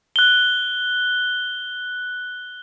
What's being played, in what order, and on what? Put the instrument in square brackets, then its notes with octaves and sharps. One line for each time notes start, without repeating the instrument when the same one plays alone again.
[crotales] F#6 G7